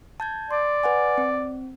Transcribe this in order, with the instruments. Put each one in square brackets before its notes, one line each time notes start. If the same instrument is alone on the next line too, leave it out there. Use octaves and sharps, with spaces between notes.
[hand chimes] A5 G6 G#6
[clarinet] D5 [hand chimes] C6
[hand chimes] B4 F#5 G#5
C4